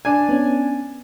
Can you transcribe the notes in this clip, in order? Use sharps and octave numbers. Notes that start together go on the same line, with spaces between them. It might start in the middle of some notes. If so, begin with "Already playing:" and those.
D4 G#5
B3 C#4